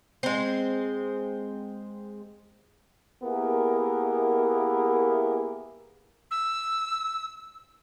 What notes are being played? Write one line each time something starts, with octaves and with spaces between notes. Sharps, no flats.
G#3 C4
A#3 B3 E4 G4 G#4 A#4
E6